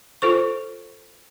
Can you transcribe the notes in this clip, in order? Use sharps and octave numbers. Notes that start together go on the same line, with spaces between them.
F4 A4 C5 C#6